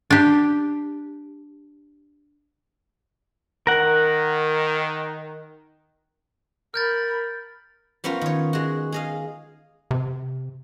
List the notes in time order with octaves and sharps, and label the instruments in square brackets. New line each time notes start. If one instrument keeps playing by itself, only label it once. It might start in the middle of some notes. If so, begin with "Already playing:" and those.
[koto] D4 G4
[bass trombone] D#3 [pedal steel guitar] A#4 F#5
[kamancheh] A#4 B5 [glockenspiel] F6 G6 A6
[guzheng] F3 B3 C#4 F4 A#4
D#3 C#5
G#3 F#4
G#4 D#5 F5
[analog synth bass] C3